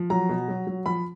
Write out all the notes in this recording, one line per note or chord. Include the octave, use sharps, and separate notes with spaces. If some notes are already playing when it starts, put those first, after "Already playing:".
Already playing: F3
F#3 A#5
B2
F#3
F#3
F3 B5